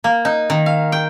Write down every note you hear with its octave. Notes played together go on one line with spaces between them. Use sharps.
A#3
D#4
D#3
F5
G5